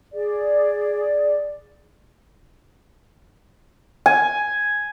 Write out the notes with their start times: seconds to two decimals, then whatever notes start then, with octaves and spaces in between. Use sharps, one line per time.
0.14 G#4 D5
4.06 G#5